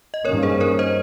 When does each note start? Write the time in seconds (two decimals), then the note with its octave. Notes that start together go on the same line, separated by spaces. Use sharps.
0.14 D#5
0.25 G2 D#3 A#3 C#4 A#4 C#5
0.43 G#4 C5
0.60 A#4 C#5
0.79 C5 D#5